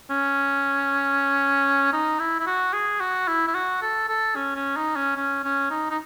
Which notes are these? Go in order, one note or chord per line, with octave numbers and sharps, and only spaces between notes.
C#4
D#4
E4
E4
F#4
G#4
F#4
E4
E4
F#4
A4
A4
C#4
C#4
D#4
C#4
C#4
C#4
D#4
D#4